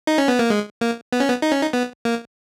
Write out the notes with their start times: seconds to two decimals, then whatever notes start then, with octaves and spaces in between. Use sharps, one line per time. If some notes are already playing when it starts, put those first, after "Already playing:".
0.07 D#4
0.18 C#4
0.28 B3
0.39 A#3
0.50 G#3
0.81 A#3
1.13 B3
1.20 C#4
1.29 B3
1.42 D#4
1.52 C#4
1.61 D#4
1.73 B3
2.05 A#3